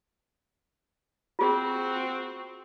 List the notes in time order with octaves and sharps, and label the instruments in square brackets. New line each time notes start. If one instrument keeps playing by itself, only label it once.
[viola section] C4 F#4 [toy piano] F4 G#4